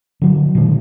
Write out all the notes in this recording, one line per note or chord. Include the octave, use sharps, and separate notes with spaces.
D3 F#3
A#2 D3 D#3 G#3